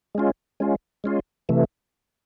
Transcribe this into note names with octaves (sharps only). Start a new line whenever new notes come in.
G#3 C#4 F4
G#3 C#4 F4
G#3 C#4 F4
C3 E3 A3